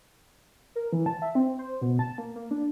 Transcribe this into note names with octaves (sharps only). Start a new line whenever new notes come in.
A#4
E3
A5
E5
C4
C5
B2
A5
A#3
A#3
D4